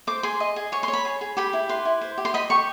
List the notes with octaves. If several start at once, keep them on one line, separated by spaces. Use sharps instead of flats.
C5 D6
G#4 C6
D#5
G#4
C#5 C#6
C6
C#5
B5
G#4
G#4
G4 B5
E4
B4 C6
E4
C5
G4
C6
D#5 B5
G4 C#6